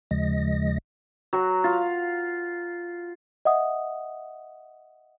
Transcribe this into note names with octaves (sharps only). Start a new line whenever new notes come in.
D#2 C#3 F3 G#3 D#5 A#6
F#3
F4
D#5 E5 F#5 D#6